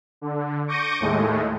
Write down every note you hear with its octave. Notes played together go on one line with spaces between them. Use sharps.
D3
C#6 D6 G6 A#6 C#7 D#7
D#2 A2 G#3 A3